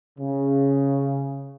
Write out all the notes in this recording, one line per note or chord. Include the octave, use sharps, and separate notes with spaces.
C#3